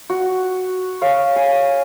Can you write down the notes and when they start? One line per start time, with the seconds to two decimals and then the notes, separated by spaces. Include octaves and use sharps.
0.10 F#4
1.02 C#5 F5
1.36 G#5